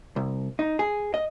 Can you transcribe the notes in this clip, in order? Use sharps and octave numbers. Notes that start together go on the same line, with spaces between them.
C2
D#4
G#4
D#5